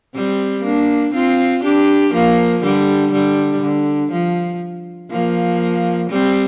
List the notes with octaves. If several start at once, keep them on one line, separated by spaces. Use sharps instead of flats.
G3 C4
A#3 D4
C4 F4
D4 G4
F3 A#3
D3 G3
D3 G3
D3
F3
F3 A#3
G3 C4